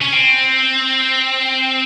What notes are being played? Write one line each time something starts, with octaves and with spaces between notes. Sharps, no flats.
C#4
C4